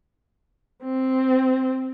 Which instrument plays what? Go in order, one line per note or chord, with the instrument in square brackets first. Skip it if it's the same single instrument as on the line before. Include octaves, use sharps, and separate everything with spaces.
[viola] C4